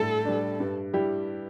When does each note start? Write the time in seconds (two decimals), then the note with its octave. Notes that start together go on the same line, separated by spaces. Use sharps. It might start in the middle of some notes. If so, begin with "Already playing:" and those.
Already playing: A2 G3 D4 A4
0.25 G3 D4
0.60 G2
0.93 G3 E4 G4